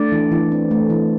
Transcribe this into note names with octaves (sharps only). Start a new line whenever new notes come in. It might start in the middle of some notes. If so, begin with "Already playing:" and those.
Already playing: A3 D4 D5
E3
E3
C4
A3
E3